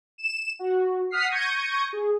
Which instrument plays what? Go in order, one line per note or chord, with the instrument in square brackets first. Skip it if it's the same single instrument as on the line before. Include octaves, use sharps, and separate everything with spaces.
[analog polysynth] E7
F#4
F#5 D#6 F6 B6 C7
C#6 G6 G#6 A#6 C#7 D#7
G#4